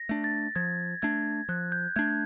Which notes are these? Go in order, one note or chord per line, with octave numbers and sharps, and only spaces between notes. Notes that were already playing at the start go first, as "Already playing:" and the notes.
Already playing: A#6
A3 D4
A6
F3 G#6
A3 D4 G#6
F3 F#6
G6
A3 D4 G#6